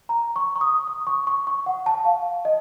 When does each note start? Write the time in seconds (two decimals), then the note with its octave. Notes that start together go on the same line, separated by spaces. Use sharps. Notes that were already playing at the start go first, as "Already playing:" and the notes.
0.09 A#5
0.36 C#6
0.56 C#6
0.61 D#6
0.87 D#6
1.07 C#6
1.27 C#6
1.47 C#6
1.66 F#5
1.86 A5
2.05 F5
2.45 D#5